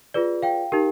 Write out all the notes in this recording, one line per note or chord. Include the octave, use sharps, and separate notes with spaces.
F4 G#4 B4 D5
F5 G5
D#4 G4 A#4